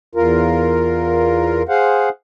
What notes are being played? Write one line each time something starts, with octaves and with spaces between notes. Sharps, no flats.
E2 F4 A#4
G#4 C5 F5 F#5